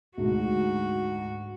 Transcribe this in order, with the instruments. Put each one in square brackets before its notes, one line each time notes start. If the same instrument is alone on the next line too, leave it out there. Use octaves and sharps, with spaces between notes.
[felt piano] D2 G#2 [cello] F#4